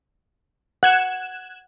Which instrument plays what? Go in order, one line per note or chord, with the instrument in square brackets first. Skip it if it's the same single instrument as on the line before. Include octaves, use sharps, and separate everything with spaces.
[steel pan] F#5 [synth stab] F#6 G#6 E7